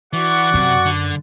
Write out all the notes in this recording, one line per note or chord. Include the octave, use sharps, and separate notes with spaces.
E3 F#4 D5 F#5 C#6
F#2 C3
D3